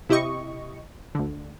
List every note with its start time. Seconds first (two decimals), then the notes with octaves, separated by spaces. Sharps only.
0.09 C3 E4 G4 D#5 C#6
1.15 D2 D3